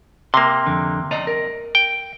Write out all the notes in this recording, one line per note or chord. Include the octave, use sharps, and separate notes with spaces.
C3 A#3 C6
F2 D3
D5 D#5 A#5
A#4
G5